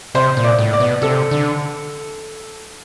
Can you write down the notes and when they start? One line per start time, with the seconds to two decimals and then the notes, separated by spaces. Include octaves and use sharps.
0.15 C3 C5
0.37 A#2
0.44 D5
0.59 A2
0.73 D5
0.80 B2
1.02 C3 A4
1.31 D3